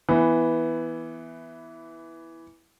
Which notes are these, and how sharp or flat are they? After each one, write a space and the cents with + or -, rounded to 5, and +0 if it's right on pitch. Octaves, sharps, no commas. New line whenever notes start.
E3 +0 B3 +0